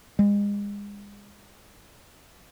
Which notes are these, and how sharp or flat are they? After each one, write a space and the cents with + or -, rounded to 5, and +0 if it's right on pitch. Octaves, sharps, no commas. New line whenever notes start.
G#3 -35